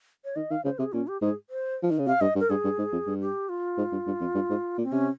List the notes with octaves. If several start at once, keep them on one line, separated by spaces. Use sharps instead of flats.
C#5
D#3 D#5
D#3 F5
C#3 C5
C3 G#4
A#2 C#4
G4
G#2 G#4
C5
F3
D#3
C#3
C3 F5
G2 D#5
G2
A#4
G2 G#4
G2
G#2
F2
G2
G4
F4
G#2
G2
G2
F2
G2
G#2
A#2
C4
C3 C#4